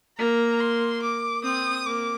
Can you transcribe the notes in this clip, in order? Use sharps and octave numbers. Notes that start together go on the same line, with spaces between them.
A#3 A#5
C6
D6
C4 D#6
A#3 D6